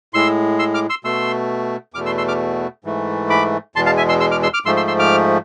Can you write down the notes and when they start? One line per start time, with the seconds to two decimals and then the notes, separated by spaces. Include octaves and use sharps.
0.14 A2 G#3 C6 E6
0.59 C6 E6
0.74 D6 F6
0.90 C6 E6
1.04 B2 A3 C6 E6
1.94 E2 B2 A3 D6 F6
2.06 C6 E6
2.18 C6 E6
2.28 D6 F6
2.84 G#2 E3 A3
3.30 B5 D6
3.76 E2 B2 G#3 A5 C6
3.86 F5 A5
3.97 E5 G#5
4.09 C6 E6
4.20 C6 E6
4.31 D6 F6
4.43 C6 E6
4.54 D6 F6
4.65 G#2 F3 A3 C6 E6
4.77 C6 E6
4.87 C6 E6
4.99 D6 F6